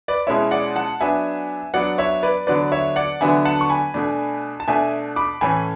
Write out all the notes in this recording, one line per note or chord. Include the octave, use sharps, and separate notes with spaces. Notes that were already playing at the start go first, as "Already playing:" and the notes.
B4 D5
B2 G#3 C#4 E4 C#5 E5
D5 F#5
F#5 A5
F#3 B3 D4 E5 G#5
F#3 B3 D4 D5 F#5
C#5 E5
B4 D5
D3 F#3 B3 D4 B4 D5
C#5 E5
D5 F#5
D3 F#3 B3 D4 E5 G#5
F#5 A5
C#6
G#5 B5
B2 A3 D4
A5
B2 A3 D4 E5 G#5
B5 D6
A2 E3 A3 C#4 G#5 B5